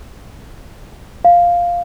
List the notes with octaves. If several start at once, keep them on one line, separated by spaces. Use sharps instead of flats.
F5